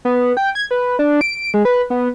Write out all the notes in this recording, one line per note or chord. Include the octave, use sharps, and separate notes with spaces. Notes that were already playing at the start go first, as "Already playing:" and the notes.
B3
G5
G#6
B4
D4
D7
G#3
B4
B3